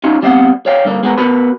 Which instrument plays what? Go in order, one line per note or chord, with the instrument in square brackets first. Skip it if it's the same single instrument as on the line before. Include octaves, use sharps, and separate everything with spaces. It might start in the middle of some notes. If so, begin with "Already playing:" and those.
[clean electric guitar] C#4 D#4 F4 F#4
G3 B3 C4 D#5 F5 F#5
C#5 D5 F5 G5
G2 D3 A#3
G#3 B3 F#4 A#4
B3 F#4 A#4 B4 B5